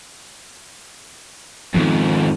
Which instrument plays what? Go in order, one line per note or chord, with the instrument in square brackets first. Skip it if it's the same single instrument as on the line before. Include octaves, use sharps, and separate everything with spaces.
[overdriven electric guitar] F2 G#2 [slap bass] D#3 F3 B3